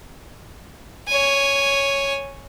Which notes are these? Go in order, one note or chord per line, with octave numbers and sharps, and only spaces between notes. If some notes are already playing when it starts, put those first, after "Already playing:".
C#5 G#5